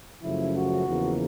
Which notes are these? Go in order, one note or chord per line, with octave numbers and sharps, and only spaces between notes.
F#2 C#3 F3 A3 E4
F#4
E2 C#3 F3 A#3